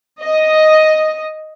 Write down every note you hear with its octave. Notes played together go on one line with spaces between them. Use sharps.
D#5